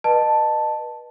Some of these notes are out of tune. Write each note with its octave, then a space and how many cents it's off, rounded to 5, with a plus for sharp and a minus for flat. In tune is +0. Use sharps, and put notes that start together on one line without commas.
B4 -25 D#5 -30 A5 +0